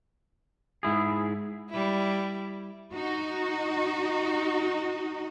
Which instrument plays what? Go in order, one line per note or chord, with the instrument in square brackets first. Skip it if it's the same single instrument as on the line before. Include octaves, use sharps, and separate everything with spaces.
[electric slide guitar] G#2 E4 G#4
[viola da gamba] G3 E4
[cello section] D#4 F#4